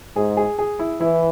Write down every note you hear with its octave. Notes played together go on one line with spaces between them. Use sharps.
G#2 G#4
G#4
G#4
E4
E3 E4